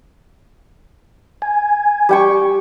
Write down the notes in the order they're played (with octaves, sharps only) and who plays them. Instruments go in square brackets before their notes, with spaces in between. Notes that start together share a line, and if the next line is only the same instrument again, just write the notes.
[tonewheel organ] G#5
[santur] G3 G5 C#6